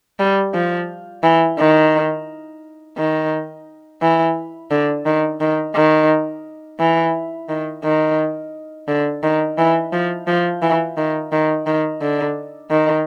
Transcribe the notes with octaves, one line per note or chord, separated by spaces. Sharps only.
G3
F3
E3
D#3
D#3
E3
D3
D#3
D#3
D#3
E3
D#3
D#3
D3
D#3
E3
F3
F3
E3
D#3
D#3
D#3
D3
D#3